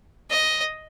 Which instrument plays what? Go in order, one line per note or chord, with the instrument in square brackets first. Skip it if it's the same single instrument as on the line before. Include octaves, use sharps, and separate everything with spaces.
[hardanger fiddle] D#5